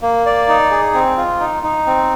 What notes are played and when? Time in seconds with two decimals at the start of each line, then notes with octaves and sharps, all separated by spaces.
0.02 A#3
0.26 D5
0.48 D#4
0.71 G#4
0.94 C4
1.17 F4
1.40 D#4
1.63 D#4
1.86 C4